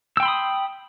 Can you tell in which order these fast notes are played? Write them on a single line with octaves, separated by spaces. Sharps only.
E6 G5 C6 B5 D#6